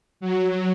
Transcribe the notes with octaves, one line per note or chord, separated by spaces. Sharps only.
F#3